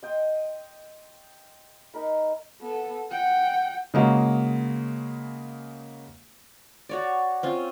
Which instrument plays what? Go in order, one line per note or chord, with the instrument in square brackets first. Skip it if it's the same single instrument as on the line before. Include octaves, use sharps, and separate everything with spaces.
[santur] D#5 G5 C6
D#4 A#4 B5
[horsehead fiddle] B3 A4
F#5 G5
[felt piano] C#3 G#3 A#3 F#4
[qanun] F#4 C#5 D5
C4 C#4 F4